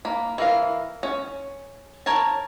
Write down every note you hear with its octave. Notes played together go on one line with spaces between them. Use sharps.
A#3 B5
E3 A#4 F5
C#4
A#4 C#5 G#5 A5